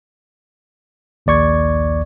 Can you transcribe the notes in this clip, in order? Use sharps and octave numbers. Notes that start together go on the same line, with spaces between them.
A#1 D#2 D5 C#6 G#6